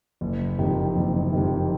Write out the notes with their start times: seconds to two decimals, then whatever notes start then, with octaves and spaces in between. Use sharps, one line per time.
0.21 F#1
0.58 F2 C3 D#3
0.96 F#1
1.33 F2 C3 D#3